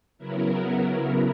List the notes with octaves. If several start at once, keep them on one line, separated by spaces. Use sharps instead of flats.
C#3 F#3 B3 E4 A#4
A#4